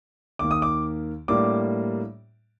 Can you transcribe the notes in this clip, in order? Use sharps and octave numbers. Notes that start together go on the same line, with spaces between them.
D#2 D#3 A#3 D6
D#6
D6
A2 G3 A#3 D4 D6